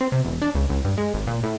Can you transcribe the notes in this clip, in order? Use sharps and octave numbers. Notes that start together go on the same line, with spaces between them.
C4
C3
E1
D4
C#2
C#2
G2
G#3
G#1
A#2
A2